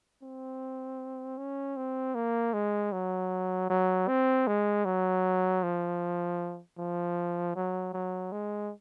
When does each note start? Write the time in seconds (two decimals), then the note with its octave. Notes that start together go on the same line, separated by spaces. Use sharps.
0.22 C4
1.38 C#4
1.76 C4
2.15 A#3
2.53 G#3
2.92 F#3
3.70 F#3
4.08 C4
4.47 G#3
4.85 F#3
5.63 F3
6.78 F3
7.56 F#3
7.93 F#3
8.32 G#3